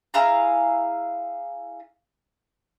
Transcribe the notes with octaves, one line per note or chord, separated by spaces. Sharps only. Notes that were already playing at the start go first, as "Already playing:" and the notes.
E4 G#4 F5 A#5